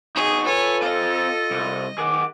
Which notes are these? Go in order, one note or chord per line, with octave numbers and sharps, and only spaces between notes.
D#4 F#4 G#4
F4 A4 B4 C#5 G#5
C4 D#5 F5
C2
D#3 G#4 F#5 D6